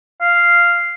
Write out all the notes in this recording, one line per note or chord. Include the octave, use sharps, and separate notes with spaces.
F5